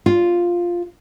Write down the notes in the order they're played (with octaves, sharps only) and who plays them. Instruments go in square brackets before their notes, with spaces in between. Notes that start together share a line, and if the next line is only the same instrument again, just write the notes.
[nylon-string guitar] F4